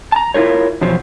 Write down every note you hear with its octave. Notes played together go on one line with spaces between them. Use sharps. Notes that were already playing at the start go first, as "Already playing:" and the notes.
A5 A#5
E4 F4 A#4 C#5
E2 B2 F3 F#3 C5